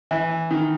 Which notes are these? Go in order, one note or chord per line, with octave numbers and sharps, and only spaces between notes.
E3
D#3